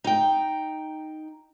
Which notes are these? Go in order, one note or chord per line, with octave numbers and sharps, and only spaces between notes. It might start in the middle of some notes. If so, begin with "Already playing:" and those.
D#4 G5